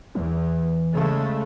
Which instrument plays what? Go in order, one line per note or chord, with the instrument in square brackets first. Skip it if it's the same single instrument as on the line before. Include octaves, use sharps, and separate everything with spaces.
[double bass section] E2 [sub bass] E3
[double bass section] C#3 G#3 A3